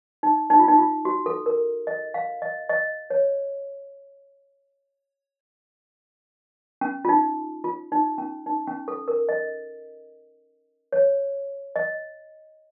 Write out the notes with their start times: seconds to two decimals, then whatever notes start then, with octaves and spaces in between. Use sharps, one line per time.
0.23 D#4
0.50 D#4
0.59 F4
0.68 D#4
0.78 F4
1.05 F#4
1.26 A4
1.46 A#4
1.87 D#5
2.14 F5
2.42 D#5
2.69 D#5
3.10 C#5
6.81 C#4
7.05 F4
7.09 D#4
7.64 F4
7.92 D#4
8.18 C#4
8.46 D#4
8.67 C#4
8.88 A4
9.08 A#4
9.29 D#5
10.92 C#5
11.76 D#5